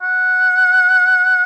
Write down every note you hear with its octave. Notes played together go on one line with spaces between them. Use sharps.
F#5